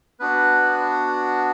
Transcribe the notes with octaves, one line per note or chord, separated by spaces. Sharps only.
B3 D4 F#4 B4